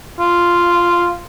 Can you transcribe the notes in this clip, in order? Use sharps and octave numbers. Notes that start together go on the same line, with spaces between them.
F4